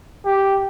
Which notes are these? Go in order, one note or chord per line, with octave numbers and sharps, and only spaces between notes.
G4